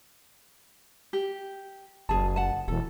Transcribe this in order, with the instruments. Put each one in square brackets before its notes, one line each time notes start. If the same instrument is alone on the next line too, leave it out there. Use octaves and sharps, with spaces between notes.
[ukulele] G4
[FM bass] F#1 [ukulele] G#4 A5
[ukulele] F#5 A5
[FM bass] E1 [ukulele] A4